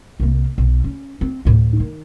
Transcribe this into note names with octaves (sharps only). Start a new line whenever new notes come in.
C2 A#3
B1
C#4
C4
D2 A2
D#3